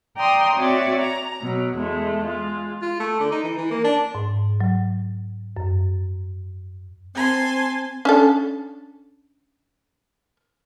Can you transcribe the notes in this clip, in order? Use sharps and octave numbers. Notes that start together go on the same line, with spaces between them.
D5 G5 A#5 C6 D#6
C4 F#4 C#5 D5 E5
A#5
B2 F#3
E2 G#3 A3
G#3 F4
F4
A3
D3
D#4
E3
E3
A#3
D4
G#2
F#3
F#2
C4 G#5 A5 C6
C#4 D4 A4